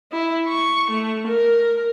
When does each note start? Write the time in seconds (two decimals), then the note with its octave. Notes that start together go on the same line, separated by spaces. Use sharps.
0.12 E4
0.48 C#6
0.90 A3
1.28 A#4